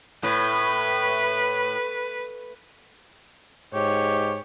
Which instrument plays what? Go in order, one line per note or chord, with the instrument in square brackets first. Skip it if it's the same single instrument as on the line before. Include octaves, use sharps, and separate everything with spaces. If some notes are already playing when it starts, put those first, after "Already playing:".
[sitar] A2 [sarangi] B4
[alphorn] G#2 [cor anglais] G4 [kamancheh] C#5